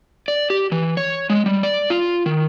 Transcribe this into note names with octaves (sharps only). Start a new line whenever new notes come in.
D5
G4
E3
C#5
G#3
G3
D5
F4
D#3